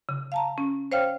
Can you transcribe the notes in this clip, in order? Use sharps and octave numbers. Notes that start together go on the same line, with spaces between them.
C#3
F5 A5 A#5
C#4
C5 C#5 F5 G5 F6